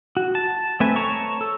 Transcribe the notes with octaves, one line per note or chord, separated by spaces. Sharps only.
F#4
A5
A3 C4 B4 E5 G#5
C#5 A5 A#5 C#6
A4